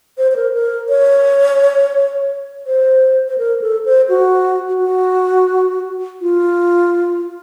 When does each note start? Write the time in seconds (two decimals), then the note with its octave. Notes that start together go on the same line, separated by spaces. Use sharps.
0.18 C5
0.31 C5
0.36 A#4
0.54 A#4
0.89 C#5
2.67 C5
3.28 C5
3.38 A#4
3.62 A4
3.85 C5
4.09 F#4
4.80 F#4
6.21 F4